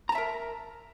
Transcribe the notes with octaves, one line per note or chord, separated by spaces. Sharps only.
A#4 E5 A5 A#5